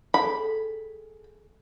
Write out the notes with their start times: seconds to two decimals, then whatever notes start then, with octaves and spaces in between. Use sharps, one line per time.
0.14 G#4 A4 G5 B5